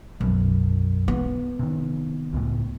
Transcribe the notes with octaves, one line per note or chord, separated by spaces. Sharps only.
B1 F#2
B3
C3 D#3
C#2 A2